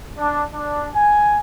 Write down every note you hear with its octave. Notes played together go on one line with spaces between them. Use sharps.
D4
D4
G#5